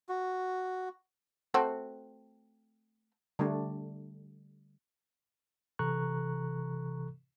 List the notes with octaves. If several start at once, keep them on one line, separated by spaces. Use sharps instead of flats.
F#4
A3 C4 F#4
D3 G3 A3 D4
C3 E3 A4 A#5 C#6 F#6